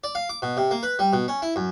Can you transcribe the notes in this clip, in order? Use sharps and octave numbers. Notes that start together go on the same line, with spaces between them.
D5
F5
D6
B2
C3
A#3
B4
G3
B2
C#4
E4
F#2